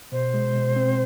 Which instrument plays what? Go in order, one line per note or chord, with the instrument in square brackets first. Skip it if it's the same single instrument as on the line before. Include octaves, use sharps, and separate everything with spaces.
[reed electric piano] B2 [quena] C5
[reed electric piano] G#3
B2
C4